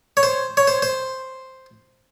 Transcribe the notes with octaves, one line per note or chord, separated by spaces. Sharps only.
C#5
C5
C#5
C5
C5